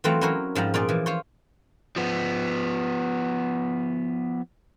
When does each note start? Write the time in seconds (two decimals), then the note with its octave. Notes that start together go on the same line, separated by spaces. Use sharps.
0.04 E3 F#3 A3 C4 F4 F#5
0.21 F#3 C#4 E4 A#4 C5 C#5
0.55 G#2 F3 G3 A#5
0.74 A#2 F4 G#4 D5
0.89 E3 F3
1.06 F4 C5 C#5
1.96 F3 B3